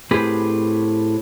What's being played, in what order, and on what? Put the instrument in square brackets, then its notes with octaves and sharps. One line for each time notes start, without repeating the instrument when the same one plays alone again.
[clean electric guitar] A2 C4 G4 G#4 B4